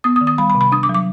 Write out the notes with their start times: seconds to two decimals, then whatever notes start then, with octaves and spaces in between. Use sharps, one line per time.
0.04 B3 D#6
0.16 D#6
0.21 D#3
0.27 D#6
0.38 G3 B5
0.50 B5
0.55 C3
0.61 B5
0.72 D4 D#6
0.83 D6
0.89 F#3
0.95 D6